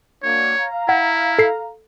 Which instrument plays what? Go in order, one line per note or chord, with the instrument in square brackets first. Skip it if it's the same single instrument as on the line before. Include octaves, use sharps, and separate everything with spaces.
[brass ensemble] F#3 A#3 D4 [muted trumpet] C#5
[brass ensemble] F5 A#5
[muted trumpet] E4 [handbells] F#5
[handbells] A4 C7